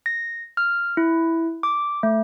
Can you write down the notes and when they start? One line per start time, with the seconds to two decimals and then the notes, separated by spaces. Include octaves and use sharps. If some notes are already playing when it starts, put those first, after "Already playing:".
0.06 A#6
0.57 F6
0.97 E4
1.63 D6
2.03 A3